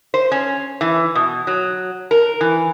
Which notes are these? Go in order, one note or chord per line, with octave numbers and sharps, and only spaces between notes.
C5
C#4
E3
B2
F#3
A#4
E3